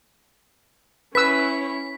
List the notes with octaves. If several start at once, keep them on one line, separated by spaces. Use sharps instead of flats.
C#4 E4 B4 C#5 E6 B6